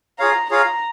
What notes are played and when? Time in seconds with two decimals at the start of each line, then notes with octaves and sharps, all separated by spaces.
0.19 F4 G#4 C#5 F5 A#5
0.50 F4 G#4 C#5 F5 A#5